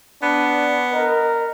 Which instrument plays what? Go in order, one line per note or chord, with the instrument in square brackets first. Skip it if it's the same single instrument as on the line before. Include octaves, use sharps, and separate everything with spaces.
[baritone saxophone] B3 [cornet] D4
[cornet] A#4 [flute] D#5